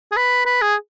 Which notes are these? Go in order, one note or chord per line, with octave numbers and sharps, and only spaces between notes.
G#4
B4
B4
G#4